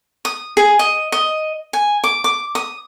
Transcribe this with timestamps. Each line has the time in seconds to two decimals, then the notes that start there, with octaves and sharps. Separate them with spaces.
0.25 D#6
0.57 G#4
0.79 D#5
1.12 D#5
1.73 G#5
2.04 D6
2.24 D6
2.55 D#6